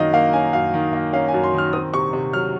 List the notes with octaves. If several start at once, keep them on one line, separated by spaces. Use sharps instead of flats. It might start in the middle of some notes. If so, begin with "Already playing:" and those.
Already playing: F#2 D#3 A#3 C#4 D#5 F5
A#3 F5
C#4 G#5
F#2 F5
D#3
A#3
C#4 F5
G#5
F#2
C6
D#3 F6
C4 D#6
C3 C#6
C3
F#3 F6